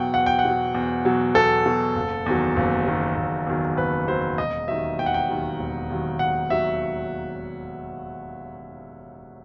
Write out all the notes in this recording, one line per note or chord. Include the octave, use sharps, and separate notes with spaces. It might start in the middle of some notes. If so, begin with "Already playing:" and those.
Already playing: E2 B2 F#3 F#5 G5
E2 F#5
G5
F#5
B2 F#3
E2
B2 F#3
E2 A4
B2 F#3
F#1
E2 D#3 F#3
F#1
E2 D#3 F#3
F#1
E2 D#3 F#3
F#1 B4
E2 D#3 F#3 C5
E1 D#5
D#2 D#3 F#3 E5
E1 G5
F#5
G5
D#2 D#3 F#3
E1
D#2 D#3 F#3
E1 F#5
D#2 D#3 F#3 E5